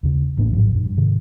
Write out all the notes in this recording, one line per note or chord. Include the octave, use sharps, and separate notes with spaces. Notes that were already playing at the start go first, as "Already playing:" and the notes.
D#2 C#3
A1 A2 A#3 D4
A1 G#2 F3 F#3
F#2 A#2
G2
G#2 C3 D#3